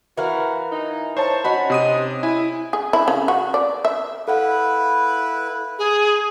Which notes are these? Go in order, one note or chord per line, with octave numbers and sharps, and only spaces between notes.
E3 F#4 A#4 F5
D#4
C5 C#5 A5
C#4 D#4 F#4 F#5 B5
C3 C5 D#6 D#7
E4 G#5
G#4
E4
C#3
F#4
D5
E5
E4 A4 B4 F5 F#5
G#4